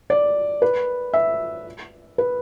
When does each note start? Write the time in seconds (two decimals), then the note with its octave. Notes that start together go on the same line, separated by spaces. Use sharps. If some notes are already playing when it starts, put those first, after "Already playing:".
0.10 D5
0.62 B4
1.13 E5
2.18 B4